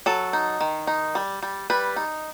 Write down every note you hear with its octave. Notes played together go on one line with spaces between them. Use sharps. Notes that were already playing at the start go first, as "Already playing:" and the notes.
F#3 A4
D#4
D#3
D#4
G3
G3
G3 B4
D#4